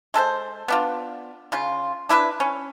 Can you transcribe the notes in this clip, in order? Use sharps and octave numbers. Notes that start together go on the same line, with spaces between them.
G#3 A4 B4 C5
B3 D4 F4
C#3 F4
D4 E4 A#4 B4
C#4